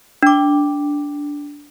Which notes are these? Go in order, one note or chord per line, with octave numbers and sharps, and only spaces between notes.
D4 D6